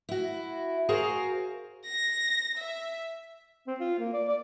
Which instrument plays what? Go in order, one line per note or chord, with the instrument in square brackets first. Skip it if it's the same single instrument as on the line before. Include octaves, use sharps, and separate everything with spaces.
[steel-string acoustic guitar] E4 F#4
F#4 G#4 A#4 C5 F5
[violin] A#6
E5
[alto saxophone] C4
F4
A#3
D5
D5